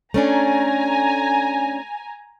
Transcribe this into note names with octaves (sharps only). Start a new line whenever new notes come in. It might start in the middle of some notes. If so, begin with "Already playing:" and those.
A3 C#4 D4 G#5 A#5